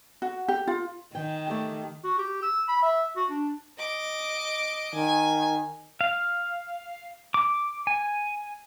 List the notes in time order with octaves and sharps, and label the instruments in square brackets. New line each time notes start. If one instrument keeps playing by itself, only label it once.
[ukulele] F#4
G4
F4
[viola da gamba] D#3 [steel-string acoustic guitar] G5
[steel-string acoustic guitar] A3 G4 A4
[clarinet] F#4
G4
E6
B5
E5
F#4
D4
[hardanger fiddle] D#5 D6
[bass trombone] D#3 [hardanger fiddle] G#5
[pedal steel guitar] F5
D6
G#5